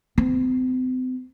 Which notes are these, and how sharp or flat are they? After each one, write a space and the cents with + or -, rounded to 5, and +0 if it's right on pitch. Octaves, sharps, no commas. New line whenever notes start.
C4 -40